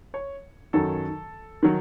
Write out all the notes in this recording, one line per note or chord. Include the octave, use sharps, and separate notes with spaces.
C#5
F#2 D#3 F#3 A4
D#3 F#3